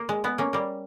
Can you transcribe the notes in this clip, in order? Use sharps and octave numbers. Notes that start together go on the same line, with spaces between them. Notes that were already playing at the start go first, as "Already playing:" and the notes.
Already playing: A#3
G#3
G#3 B3
A#3 C#4
G3 A#3